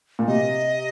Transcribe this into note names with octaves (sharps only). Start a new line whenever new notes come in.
A#2
C3 D#5